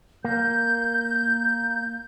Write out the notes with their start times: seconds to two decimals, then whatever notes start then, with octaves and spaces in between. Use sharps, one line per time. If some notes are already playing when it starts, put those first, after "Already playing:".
0.25 A#3 G6